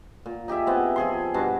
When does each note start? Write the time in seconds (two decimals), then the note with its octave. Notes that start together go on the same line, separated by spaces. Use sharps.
0.26 A#2
0.48 D#4 G4 G#4 E5
0.67 B3 C4 E4
0.96 F3 G#4 C6
1.34 G2 B2 A5